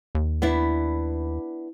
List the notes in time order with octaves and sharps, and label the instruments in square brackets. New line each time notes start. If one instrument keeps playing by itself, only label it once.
[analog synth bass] D#2
[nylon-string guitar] B3 D4 E4